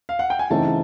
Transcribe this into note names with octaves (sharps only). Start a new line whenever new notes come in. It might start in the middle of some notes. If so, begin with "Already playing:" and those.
F5
F#5
G5
G#5
C#3 E3 A3 C4 D#4 A5